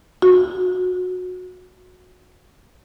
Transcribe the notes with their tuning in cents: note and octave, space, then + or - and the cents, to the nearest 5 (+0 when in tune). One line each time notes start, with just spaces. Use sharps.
F#4 -20